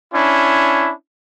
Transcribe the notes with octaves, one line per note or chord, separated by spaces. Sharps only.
C#4 D4 E4